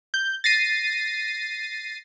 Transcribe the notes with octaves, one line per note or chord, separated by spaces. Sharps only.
G6
A6 A#6 C7 D#7